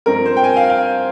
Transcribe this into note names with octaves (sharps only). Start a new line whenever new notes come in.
G2 F3 C4 A#4
C5
G5
G#5
F5
F5